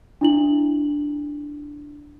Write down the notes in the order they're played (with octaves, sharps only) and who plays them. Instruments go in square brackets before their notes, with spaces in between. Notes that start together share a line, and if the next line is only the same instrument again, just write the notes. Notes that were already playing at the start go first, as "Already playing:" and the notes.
[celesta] D4 E4 F#7